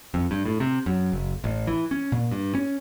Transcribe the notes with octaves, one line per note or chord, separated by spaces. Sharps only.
F2
G2
A2
C3
F#2
F#1
A1
E3
C#4
A#2
G2
C#4